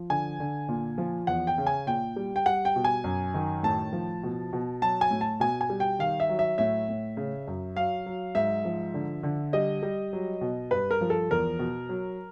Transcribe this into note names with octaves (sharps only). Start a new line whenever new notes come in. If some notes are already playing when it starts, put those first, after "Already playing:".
Already playing: F3
D3 G#5
D3
A#2
F3
E2 F#5
G5
C#3
G#5
A#2 G5
G3
G5
G3 F#5
G5
B2
G#5
F#2
D#3
A2 A5
F3
B2
B2
F#3 A5
G#5
A2
A5
B2 G#5
G#5
G3
G5
D#3 F5
E5
F#3
E5
A2 E5
A2
C#3
F#2
F#3 F5
F#3
G#2 E5
F3
D3
D3
G3 D#5
G3
F#3
B2
G2 B4
A#4
F3
A4
E2 A#4
B2
F#3